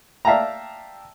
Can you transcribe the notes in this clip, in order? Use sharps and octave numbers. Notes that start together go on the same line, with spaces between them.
D5 E5 F5 G5 A5 A#5